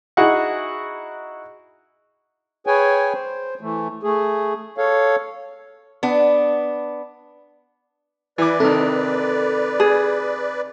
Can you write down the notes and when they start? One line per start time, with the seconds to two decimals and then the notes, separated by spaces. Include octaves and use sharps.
0.17 D#4 E4 F#4 G#4 F#5
2.67 G#4 B4 C#5 G5 G#5
3.13 C5
3.61 E3 A3
4.03 A3 G#4
4.78 A4 C#5 F5
6.03 B3 D4
8.38 E3 B4 D5 D6
8.60 C3 D#3 A4
9.80 G#4